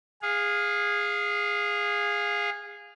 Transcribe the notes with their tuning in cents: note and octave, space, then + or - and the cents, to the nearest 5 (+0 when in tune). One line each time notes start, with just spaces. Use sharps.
G#4 -15 F5 +15